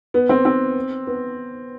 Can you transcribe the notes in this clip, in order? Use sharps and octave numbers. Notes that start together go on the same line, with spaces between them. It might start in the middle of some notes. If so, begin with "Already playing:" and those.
B3
C4
C4
B3